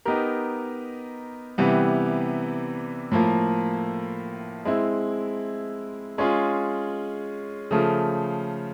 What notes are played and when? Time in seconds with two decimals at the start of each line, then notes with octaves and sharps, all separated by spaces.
0.05 B3 D#4 G4 A#4
1.58 C3 E3 G3 B3
3.11 A2 F3 A#3
4.65 G#3 C4 E4
6.18 G#3 C#4 F4 G#4
7.71 C#3 F3 A3